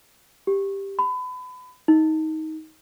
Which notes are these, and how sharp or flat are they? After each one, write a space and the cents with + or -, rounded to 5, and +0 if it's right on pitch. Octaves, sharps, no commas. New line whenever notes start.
G4 +5
B5 +30
D#4 +20